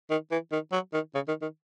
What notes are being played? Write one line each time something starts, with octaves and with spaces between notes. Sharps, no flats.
D#3
E3
D#3
F#3
D#3
C#3
D#3
D#3